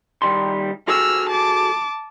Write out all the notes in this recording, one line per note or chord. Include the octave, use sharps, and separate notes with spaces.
D#3 G3 C6
F#4 G#4 A4 E6 F6
A5 D6